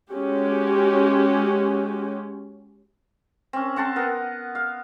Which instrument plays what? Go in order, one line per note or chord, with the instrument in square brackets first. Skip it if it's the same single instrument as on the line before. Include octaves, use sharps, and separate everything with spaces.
[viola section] G#3 C#4 F#4 G4
[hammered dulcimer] C4 C#4
C4 F#5 A5 C6
B3 A#4
F5